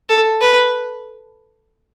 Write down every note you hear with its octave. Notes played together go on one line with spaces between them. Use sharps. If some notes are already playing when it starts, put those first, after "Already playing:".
A4
B4